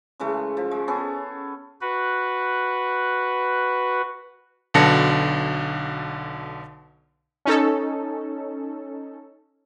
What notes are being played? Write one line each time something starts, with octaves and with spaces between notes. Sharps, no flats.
C#3 E3 G#3 A3
F3
G#3
B3 C#4 G#4 A4
F#4 B4
B1 B2 D3 A5 A#6 C#7
C#4 D#4 A4